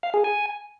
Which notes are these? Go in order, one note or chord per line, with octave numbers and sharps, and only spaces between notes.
F5
G#4
G#5